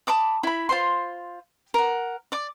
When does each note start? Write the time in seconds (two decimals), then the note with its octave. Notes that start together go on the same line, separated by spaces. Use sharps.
0.07 A5 B5 D6 D#6
0.43 E4 B5
0.69 F4 C5 C6
1.74 A#4 F#5
2.32 D5 D6